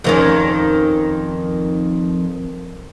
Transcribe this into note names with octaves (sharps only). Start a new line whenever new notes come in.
F2 D#3 C#4